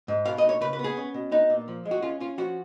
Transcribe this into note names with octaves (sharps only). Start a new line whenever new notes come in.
G#2
B2 F5
D#5
D#4
C#5
C#3 B4
B4
B3
G#4
C#4
B2
B3 D#4
A#2
F3
G#3
F#4
C#4 F4
C#4 F4
F3 F#4